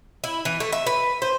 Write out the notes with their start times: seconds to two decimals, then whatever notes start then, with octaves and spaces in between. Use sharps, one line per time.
0.24 E4
0.45 E3
0.60 A3
0.72 E5
0.87 B4
1.22 C5